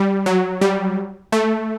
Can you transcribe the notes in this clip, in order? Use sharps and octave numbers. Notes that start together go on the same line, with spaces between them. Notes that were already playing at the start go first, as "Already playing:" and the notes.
Already playing: G3
F#3
G3
A3